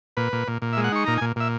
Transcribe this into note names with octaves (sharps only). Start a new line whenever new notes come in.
A#2 B4
A#2
A#2
A#2
E5
G#3
F#5
D#4 C#6
A#2 A#5
G#5
A#2
A#2 E5